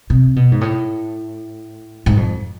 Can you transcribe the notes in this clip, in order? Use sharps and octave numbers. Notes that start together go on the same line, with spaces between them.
C3
B2
G#2
A2
G#2
F2